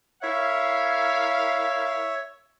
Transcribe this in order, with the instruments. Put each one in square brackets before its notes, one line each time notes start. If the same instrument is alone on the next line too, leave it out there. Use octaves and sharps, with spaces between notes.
[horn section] E4 A#4 F5 [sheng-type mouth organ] C#5 E5